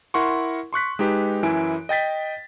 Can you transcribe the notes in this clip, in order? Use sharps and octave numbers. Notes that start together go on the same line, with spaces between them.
E4 A#4 F#5 C6 C#6
C6 C#6 F#6 B6
G#3 D#4 G4 B4
F#2 E3 E4 G#5 D7
D#5 G5 A6 B6